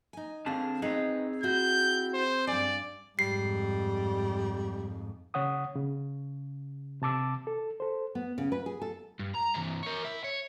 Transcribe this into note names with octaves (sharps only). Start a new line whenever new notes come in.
D#4 G#5
D3 C4 G#4 F5 A5
C4 D#4 G#4 B4
E4 F#4 G6
C5
G2 D5 G#5
F2 G#2 G3 C7
C#3 C#5 F#5 D#6
C#3
C3 A5 D6 E6
A4
A4 C5
B3
C#3
B4
G#4
A4
G2
A#5
G2 E3
A#4 C#5
E4
C#5